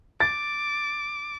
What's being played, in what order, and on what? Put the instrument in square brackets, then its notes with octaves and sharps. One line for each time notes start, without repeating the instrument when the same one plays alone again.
[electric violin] D6 [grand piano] A6